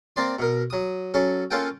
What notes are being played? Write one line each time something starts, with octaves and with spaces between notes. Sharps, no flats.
A#3 C4 D5 C6
B2 A#4
F#3 D#6
F#3 C#4 A4
A#3 C#4 F4 A4 F#5 G5